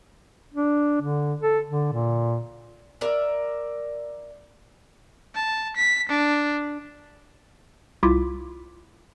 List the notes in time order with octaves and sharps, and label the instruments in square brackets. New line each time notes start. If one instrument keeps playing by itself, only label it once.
[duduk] D4
D3
A4
D3
A#2
[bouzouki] A#4 D5 E5
[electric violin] A5
B6
D4
[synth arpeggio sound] C2 E4 F4 D6 B6